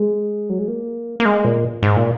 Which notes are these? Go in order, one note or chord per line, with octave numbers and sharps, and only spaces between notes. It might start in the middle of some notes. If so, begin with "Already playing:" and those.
Already playing: G#3
F#3
G#3
A#3
A#3
G#3
A#2
G#2
A#2